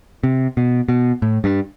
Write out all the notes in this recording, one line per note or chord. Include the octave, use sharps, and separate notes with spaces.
C3
B2
B2
A2
G2